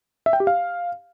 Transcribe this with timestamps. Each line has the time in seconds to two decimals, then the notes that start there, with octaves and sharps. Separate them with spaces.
0.26 E5
0.33 G5
0.40 G4
0.47 F5